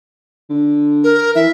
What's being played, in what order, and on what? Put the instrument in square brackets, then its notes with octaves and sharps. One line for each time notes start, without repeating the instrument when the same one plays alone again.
[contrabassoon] D3
[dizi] A#4
[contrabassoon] E3 [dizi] E5